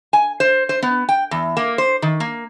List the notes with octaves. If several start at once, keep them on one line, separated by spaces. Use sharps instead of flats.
G#5
C5
C5
B3
G5
E2
A#3
C5
D#3
A#3